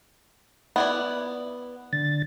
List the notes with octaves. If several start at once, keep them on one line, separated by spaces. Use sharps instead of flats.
B3 E4 D5
D3 A6